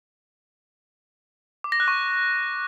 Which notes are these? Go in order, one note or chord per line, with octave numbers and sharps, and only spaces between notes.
D6
A#6
F#6
C#6